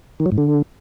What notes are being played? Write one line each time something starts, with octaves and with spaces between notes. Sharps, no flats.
D#3
F#3
G#2
D3